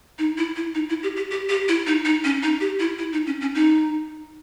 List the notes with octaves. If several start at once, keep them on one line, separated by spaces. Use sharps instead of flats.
D#4
E4
E4
D#4
E4
G4
G4
G4
G4
E4
D#4
D#4
C#4
D#4
G4
E4
E4
D#4
C#4
C#4
D#4